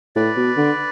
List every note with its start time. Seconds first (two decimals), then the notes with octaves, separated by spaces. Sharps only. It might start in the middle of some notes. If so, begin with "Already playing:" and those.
0.16 A2 B4 D5
0.36 B2
0.57 D3